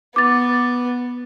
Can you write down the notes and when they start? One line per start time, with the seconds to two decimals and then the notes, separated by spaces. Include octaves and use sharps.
0.16 B3 D6 A6